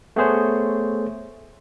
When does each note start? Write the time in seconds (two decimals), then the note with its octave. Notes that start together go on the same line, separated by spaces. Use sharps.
0.16 A3 B3 G#4 C5 C#5